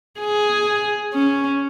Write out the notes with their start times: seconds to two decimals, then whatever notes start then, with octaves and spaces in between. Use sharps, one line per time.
0.20 G#4
1.13 C#4